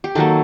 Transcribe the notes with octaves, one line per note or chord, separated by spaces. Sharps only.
G4
D#3 F#3 A#3 A4